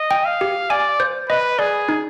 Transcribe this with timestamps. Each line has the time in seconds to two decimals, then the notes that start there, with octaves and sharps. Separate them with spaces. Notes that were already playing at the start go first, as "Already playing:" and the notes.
Already playing: D#5
0.11 G5
0.25 F5
0.41 G4
0.70 D5 G#5
1.00 C5
1.29 B4 D#5
1.59 G#4 D5
1.89 D#4